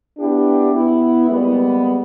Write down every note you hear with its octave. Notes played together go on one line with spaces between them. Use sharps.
B3 D4 E4 G4
B3 E4
G3 G#3 A#3 B3